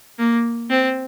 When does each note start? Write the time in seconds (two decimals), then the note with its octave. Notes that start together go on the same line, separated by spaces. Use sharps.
0.18 A#3
0.70 C4